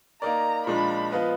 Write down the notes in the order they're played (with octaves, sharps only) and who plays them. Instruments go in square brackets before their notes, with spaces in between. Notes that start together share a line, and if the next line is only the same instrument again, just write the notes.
[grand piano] A#3 D#4 A#4 D5 [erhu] A#5
[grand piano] A#2 F3 G#3 D4 [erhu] B5
[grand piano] F3 B3 F4 B4 D#5